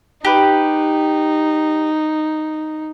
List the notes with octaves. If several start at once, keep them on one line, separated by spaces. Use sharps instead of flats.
D#4 G4 B4